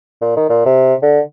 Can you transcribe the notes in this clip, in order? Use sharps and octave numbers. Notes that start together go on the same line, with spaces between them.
A#2
D#3
A#2
C3
D3